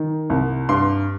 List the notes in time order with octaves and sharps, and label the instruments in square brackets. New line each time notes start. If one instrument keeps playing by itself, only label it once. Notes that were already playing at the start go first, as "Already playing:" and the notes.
Already playing: [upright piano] D#3
C2
G2 C6